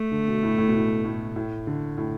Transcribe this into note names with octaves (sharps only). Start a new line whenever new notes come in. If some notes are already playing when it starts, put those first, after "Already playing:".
Already playing: A3
D3
B2
A2
A2
B2
A2
A2
A2
D3
A2